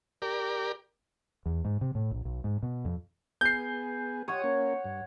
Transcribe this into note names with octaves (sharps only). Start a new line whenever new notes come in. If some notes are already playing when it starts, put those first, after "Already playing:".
G4 A#4 D5
E2
G#2
C3
A2
A#1
B1
G#2
B2
F2
B3 G#4 G6 C7
G4 C#5 F#5 D#6
A#3 C#4
G2